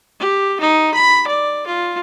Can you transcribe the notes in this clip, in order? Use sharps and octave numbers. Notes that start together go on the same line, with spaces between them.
G4
D#4
B5
D5
F4